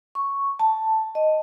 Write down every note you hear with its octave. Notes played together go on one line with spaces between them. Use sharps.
C#6
A5
D#5